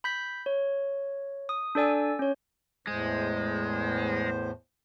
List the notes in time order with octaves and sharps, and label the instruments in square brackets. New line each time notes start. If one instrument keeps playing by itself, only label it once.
[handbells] B5 G6 B6
C#5
D#6
D4 A4 D5 G#5 E6
C#4 C#5
[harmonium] E2 A2 C5 [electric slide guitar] G#3